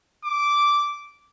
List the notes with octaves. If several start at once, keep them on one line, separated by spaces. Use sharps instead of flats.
D6